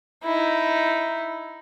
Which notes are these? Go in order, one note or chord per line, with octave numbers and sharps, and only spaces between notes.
D#4 E4